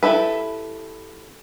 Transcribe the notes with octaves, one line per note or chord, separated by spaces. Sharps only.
E4 G4 A4 B4